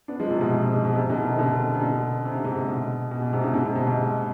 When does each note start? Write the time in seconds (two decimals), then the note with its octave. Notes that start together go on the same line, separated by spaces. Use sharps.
0.08 B3 D4
0.19 F3 G#3
0.30 G#2 C3
0.41 B2
0.52 G#2
0.63 B2
0.74 G#2
0.85 B2
0.95 G#2 C3
1.10 B2 D3
1.24 C3 D#3
1.39 B2 D3
1.74 C3
1.81 B2 D3
2.25 C3
2.34 D3
2.44 G#2 C3
2.68 B2
3.11 B2
3.22 B2
3.33 G#2 C3
3.43 B2 D3
3.54 B2 D3
3.65 G#2 C3
3.76 B2
3.87 G#2